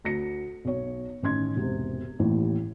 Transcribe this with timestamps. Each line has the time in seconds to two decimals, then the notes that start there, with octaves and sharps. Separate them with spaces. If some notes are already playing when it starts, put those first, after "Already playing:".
0.04 D2 A#6 C#7
0.65 B1 C#5
1.23 A1 D#3 C#4 C6 G#6
1.56 E1 G#2 C3
2.19 A1 D#2 A2 E3